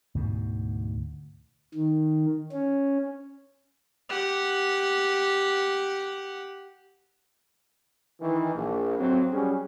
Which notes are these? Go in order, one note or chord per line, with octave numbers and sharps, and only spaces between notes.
D2 G#2 B2
D#3
C#4
G4 F#5
D#3 E3
A#1
F2 F#3 C4
F#3 G3 C#4 G#4